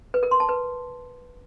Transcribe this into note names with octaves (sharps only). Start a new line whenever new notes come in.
B4
A#4
C6
A5
B4